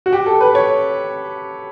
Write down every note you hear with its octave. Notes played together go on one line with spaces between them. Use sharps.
F#4
G4
A4
B4
C#5